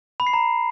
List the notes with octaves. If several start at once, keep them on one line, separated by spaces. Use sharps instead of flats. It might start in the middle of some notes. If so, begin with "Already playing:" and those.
B5
C7
A#5